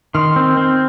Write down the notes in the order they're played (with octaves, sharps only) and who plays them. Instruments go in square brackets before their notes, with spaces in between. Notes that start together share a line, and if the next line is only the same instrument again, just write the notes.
[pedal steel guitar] D#3 [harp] C6 F6
[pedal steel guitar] C4
C4